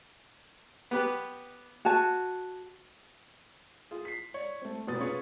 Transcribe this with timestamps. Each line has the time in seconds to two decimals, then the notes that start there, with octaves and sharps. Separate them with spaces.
0.91 B3 G4 B4
1.85 F#4 G#5 A5
3.91 F4 G#4
4.05 B6 C7
4.34 C#5 D5
4.62 A3 C4
4.87 F1 B2 B3 D#6 A6
5.00 C#4 F4 G#4 B4 C#5